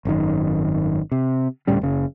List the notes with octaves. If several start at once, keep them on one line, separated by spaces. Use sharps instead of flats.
G#1 F#2 D#3
C3
D2 A2 G3 C#4
F#1 C#3